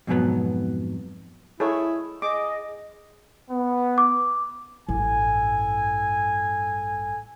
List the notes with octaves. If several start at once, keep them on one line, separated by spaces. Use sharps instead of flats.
F2 G#2 B2 F#3 B3
E4 G#4 A4 C#5
G#4 D#5 D6
B3
D6
A1 G2 A4 G#5